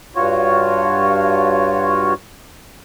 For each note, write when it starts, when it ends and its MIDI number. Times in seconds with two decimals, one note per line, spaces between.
0.16 2.14 43
0.16 2.14 65
0.16 2.14 66
0.16 2.14 73